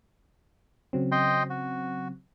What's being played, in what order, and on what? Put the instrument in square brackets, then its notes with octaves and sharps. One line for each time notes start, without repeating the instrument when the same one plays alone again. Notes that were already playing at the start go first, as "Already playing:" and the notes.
[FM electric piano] C#3 F#3 C4
[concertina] D#5 G5 C6
F#4